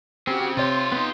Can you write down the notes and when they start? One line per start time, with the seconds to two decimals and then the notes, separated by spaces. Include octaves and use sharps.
0.27 C#3 C4 F#4 G4
0.41 C4
0.57 C3 F4 G4 C#5 C6
0.92 B3 D#4